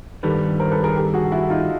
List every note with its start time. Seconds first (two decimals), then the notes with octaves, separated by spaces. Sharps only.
0.23 G2 D#3 G3 A4 B4
0.59 A#4 C5
0.72 A4 B4
0.83 G#4 A#4
0.96 G4 A4
1.14 F#4 G#4
1.31 E4 F#4
1.50 D#4 F4